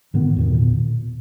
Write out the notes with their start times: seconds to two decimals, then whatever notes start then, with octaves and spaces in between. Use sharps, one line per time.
0.14 G#2 D3 D#3 B3
0.36 E2 B2 D#3
0.54 A#2